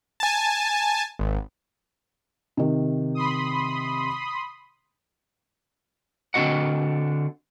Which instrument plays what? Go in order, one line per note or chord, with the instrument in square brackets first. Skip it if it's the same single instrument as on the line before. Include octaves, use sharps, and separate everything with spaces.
[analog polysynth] G#5 A5
G#1
[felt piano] C3 D#3
[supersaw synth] B5 C6 D#6
[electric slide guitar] D3 C4 F#4 D#5 F#5